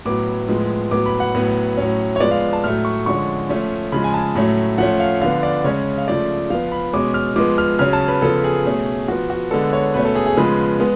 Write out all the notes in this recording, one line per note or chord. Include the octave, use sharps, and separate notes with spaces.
A2 F#3 B3 D6
A2 F3 G#3 B3
A2 F#3 B3 D6
B5
F#5
A2 F#3 B3
A2 F#3 C#4
C#5
F3 G#3 B3 D5
F5
A5
A2 F#3 A3 F6
C#6
D3 F3 G#3 C#4 C#6
F3 A3 C#4
C#3 F3 G#3 B5
G#5
A5
A2 F#3 A3 C#4
F3 A3 C#4 F#5
F5
D3 F3 B3 F5
D5
C#3 G#3 C#4 C#5
F5
C#3 F3 A3 D5
F3 B3 F5
B5
B2 G#3 C#4 D6
F6
F3 G#3 B3 D6
F6
C#3 F#3 C#4 F6
A5
B4
C#3 F3 B3 A4
G#4
B2 A3 C#4
F3 B3 F#4
F#4
D3 G#3 B3 A4
C#5
B2 A3 C#4 B4
A4
G#4
G#4
C#3 F3 G#3 B3 B4
G#3 B3